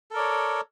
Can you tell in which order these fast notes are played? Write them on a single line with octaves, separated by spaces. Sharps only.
A4 A#4 D5 C#5